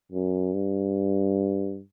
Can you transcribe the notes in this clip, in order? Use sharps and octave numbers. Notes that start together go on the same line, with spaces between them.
F#2
G2